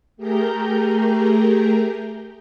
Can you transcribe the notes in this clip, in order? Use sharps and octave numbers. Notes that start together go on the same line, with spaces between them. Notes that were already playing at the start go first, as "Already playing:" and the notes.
A3 G4 G#4 A#4 A#5 G6